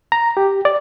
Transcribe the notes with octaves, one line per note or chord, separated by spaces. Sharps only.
A#5
G4
D5